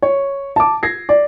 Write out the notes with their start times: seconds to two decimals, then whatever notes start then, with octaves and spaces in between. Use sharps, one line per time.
0.02 C#5
0.56 A5 D6
0.83 G#6 A#6 C7
1.09 D5